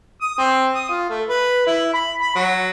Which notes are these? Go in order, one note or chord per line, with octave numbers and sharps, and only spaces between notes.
D#6
C4
D#6
F4
A3
B4
E4
B5
B5
F#3